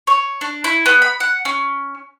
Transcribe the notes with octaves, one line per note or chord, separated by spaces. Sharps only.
C#5
D4
E4
B3
B5
F#5
C#4